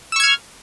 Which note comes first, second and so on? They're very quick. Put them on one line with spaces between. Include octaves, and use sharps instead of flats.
E6 C#6 G#6 F6